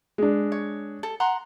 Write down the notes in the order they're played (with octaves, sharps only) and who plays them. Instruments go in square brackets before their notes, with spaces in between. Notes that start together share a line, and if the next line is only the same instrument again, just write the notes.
[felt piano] G#3 D4
[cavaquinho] C#5
A4
F#5 A#5 C6